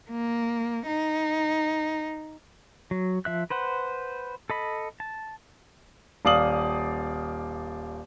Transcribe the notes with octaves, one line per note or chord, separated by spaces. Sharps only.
A#3
D#4
F#3
F3 E5 F#6
B4 C5 F#5
A4 D#5 B5
A5
D#1 D5 F5 D#6 F#7